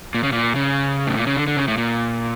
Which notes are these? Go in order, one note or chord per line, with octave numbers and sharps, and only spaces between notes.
A#2
C#3
A#2
C#3
A2
A#2
C#3
D3
D3
C#3
A2
A#2